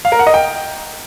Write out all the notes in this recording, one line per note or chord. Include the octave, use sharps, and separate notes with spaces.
F5
A#4
F#5
D#5
G5